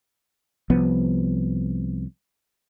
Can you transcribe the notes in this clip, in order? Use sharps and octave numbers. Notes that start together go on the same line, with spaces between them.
C2 F3 B3